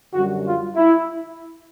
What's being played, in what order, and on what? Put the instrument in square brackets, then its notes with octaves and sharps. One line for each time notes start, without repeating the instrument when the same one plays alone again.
[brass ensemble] F#2 D3 G3 F#4
F4
E4